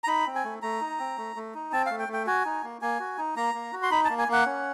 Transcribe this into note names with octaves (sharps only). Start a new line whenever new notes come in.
A#5
D#4 B5
C4
G#5
A3
A3 A#5
D#4
C4
A3
A3
D#4
C4 A5
A3 F5
G5
A3
G5
F#4 G#5
D#4
A#3
A#3 G#5
F#4
D#4
A#3 A#5
A#3
F#4
C6
D#4 B5
A5
A#3
G#5
A#3 F#5
C#4